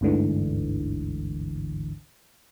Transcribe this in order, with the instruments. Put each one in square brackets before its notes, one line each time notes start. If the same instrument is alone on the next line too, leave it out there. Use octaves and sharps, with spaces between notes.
[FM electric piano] G1 D2 G#2 D3 E3